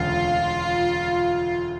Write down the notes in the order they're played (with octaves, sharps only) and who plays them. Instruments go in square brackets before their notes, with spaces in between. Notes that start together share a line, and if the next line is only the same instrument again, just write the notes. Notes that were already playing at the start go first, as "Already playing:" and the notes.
Already playing: [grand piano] E1 D2 C#3 [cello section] F4